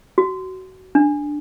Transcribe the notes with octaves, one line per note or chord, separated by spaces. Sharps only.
F#4
D4